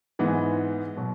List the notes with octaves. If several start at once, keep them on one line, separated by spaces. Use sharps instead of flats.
G#2 E3 G#3 B3
B2 F#3